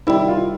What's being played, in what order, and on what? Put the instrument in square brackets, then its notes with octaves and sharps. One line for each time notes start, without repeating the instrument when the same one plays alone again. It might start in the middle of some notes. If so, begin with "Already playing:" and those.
[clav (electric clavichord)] C3 D#3 G3 [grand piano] E4
[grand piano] F4